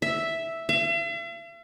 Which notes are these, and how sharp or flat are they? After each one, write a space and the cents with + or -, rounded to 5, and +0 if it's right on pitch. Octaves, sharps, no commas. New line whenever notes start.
E5 +0
E5 +45